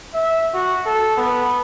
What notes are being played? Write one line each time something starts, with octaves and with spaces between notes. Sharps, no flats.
E5
F#4
A4
B3